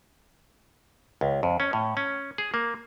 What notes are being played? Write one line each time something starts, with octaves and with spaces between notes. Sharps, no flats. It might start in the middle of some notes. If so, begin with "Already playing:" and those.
C#2
F2
C#4
A2
C#4
G#4
A#3